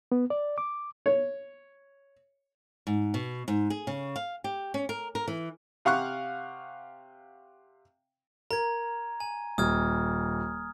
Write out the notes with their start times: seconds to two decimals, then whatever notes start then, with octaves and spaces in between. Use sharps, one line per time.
0.12 B3
0.30 D5
0.58 D6
1.06 C#5
2.87 G#2
3.14 B2
3.48 G#2
3.70 G#4
3.87 C#3
4.16 F5
4.44 G4
4.74 C#4
4.89 A#4
5.15 A#4
5.28 E3
5.85 C3 F5 F#5 C#6 F#6
8.51 A#4 A#5 G#6
9.20 G#5
9.58 D#1 D#6 F6 G#6